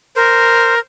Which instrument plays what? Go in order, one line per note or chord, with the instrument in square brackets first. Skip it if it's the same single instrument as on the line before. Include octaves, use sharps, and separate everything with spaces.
[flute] A#4 [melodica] C5